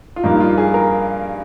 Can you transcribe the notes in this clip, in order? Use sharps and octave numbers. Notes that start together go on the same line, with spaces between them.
F4
G2 F3 A#3 D#4
F4
G#4
A#4